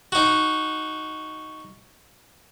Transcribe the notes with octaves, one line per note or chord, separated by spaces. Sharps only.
D#4 F#4